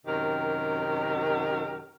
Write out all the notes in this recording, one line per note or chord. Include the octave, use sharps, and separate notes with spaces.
F#2 C3 D#3 G4 A#4